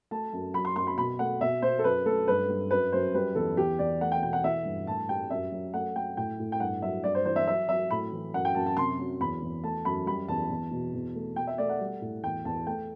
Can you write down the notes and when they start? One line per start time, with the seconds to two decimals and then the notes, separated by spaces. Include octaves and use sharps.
0.11 A3 A5
0.33 F#2
0.54 F#3 B5
0.65 C6
0.76 F#2 C6
0.87 B5
0.98 B2 B5
1.19 A3 F#5
1.41 B2 E5
1.62 B2 C5
1.79 A4
1.84 F#2 B4
2.06 A3 A4
2.28 G2 B4
2.49 G2
2.71 F#2 B4
2.92 F#2 C5
3.14 G3 B4
3.35 E2 A4
3.57 E2 G4
3.79 E2 D5
4.01 A3 F#5
4.12 G5
4.22 B2 G5
4.33 F#5
4.44 E3 E5
4.65 G2
4.87 A2 A5
5.09 G3 G5
5.30 F#2 E5
5.52 F#3
5.74 A3 F#5
5.96 A3 G5
6.17 A2 G5
6.39 A2
6.52 G5
6.60 G2 F#5
6.82 F#3 E5
7.04 G2 D5
7.15 C5
7.25 E3 C5
7.36 E5
7.47 F#3 E5
7.69 F#3 E5
7.91 A2 B5
8.12 E3
8.34 F#2 F#5
8.45 G5
8.55 F#2 A5
8.66 A5
8.77 C3 C6
8.99 F#3
9.20 E2 B5
9.42 E2
9.64 A3 A5
9.85 F#2 B5
10.07 G3 B5
10.28 E2 A5
10.50 E2
10.71 B2
10.94 E2
11.15 A3
11.36 B2 G5
11.47 E5
11.58 A3 D5
11.69 F#5
11.80 G3
12.02 A2
12.24 E2 G5
12.45 E2 A5
12.67 A3 G5